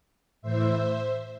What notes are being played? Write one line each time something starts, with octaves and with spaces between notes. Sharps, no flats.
A2 E3 C5 E5